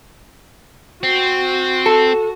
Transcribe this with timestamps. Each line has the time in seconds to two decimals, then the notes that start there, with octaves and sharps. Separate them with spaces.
1.03 C4 F#4
1.86 A4